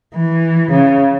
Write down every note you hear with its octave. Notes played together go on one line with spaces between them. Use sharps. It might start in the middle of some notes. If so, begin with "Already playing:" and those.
E3
C#3